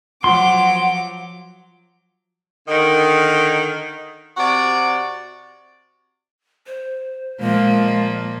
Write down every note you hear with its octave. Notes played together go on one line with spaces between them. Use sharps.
F3 F#3 F#5 C6 D6
D3 D#3
C3 F#4 D5
C5
A#2 F3 G#3 A#3